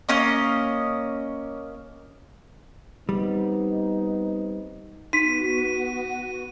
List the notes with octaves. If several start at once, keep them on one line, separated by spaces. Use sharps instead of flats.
A#3 C#4 D#5
G3 B3 C4 D#4
B3 D#4 F#4 B6 D#7